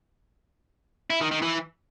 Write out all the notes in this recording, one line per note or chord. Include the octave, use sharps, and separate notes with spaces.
E4
D#3
D#3
E3